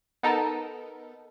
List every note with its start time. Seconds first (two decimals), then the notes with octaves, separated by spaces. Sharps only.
0.23 B3 D#4 A4 A#4